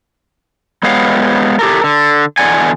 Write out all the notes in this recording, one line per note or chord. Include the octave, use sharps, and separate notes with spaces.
G#3 B3 G4 C#5 F5 F#5
G4 A4 A#4
D3
E2 B2 D3 D5 F#5 G#5